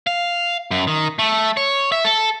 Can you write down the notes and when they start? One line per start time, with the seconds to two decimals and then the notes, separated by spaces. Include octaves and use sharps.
0.07 F5
0.71 F#2
0.87 D#3
1.19 A3
1.57 C#5
1.92 E5
2.05 A4